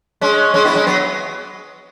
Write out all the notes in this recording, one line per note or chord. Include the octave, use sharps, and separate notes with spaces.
G#3 C#4
G#3 C#4
B3 E4
G#3 C#4
F#3 B3